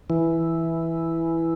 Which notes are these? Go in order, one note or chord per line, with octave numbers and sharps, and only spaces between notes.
E3